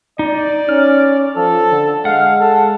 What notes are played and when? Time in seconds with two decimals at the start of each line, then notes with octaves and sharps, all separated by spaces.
0.19 D#4 D5
0.69 C#4 F6
1.36 F3 A4
1.71 D3
2.05 G#3 F5 F#5
2.40 A4